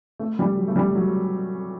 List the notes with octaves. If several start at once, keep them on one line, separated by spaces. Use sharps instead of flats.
A3
G3
F#3
A3
G3
F#3